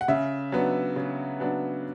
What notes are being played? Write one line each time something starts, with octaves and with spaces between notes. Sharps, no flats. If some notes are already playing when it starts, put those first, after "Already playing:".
F#5
C#3 E5
F#3 B3 D4
C#3
F#3 B3 D4